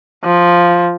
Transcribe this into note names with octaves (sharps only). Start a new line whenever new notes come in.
F3